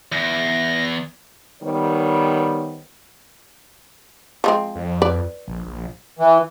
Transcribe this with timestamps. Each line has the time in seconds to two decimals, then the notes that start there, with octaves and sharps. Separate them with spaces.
0.12 E2 A#6
1.63 D#3 G3 B3 C5 C#5
4.44 F3 G#3 C4
4.76 F2
5.02 B4 D5
5.48 A#1
5.66 A#1
6.19 E3